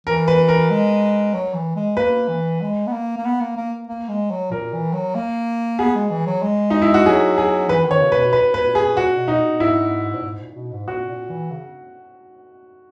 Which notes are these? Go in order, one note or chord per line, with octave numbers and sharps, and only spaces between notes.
E3 A#4
B4
A#4
G#3
F#3
E3
G#3
A#3 B4
E3
G#3
B3
A#3
A#3
B3
A#3
A#3
A#3
G#3
F#3
A#2 A#4
E3
F#3
A#3
B3 G#4
G#3
E3
F#3
G#3
D#4
E4
F#4
F#3 G#4
G#4
E3 B4
D#3
C#5
C#3
B4
B2
B4
B4
A#2
G#4
A#2 F#4
B2
D#4
A#2
G#2 E4
A#2
G#2
A#2
B2
G#2
A#2 F#4
A#2
E3
C#3